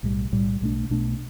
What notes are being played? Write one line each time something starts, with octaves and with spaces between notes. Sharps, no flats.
B1 A2 G3
B1 A2 G3
B1 B2 A3 D4
B1 B2 A3 D4